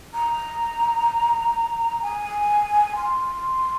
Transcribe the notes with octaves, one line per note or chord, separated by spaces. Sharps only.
A#5
G#5
C6